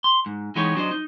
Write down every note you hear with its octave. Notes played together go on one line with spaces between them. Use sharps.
C6
G#2
E3 G#3 B3 D#4 G4 C#5
F#3 D4 C5 D#5
D#4